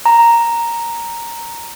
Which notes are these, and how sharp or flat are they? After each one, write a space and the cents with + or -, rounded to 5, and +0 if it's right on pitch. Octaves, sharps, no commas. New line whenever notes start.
A#5 +0